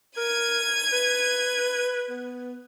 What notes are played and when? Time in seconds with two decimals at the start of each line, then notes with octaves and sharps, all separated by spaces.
0.17 A#4 G#6 D#7
0.92 B4
2.10 B3